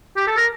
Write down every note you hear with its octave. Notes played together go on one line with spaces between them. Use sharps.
G4
A4
A#4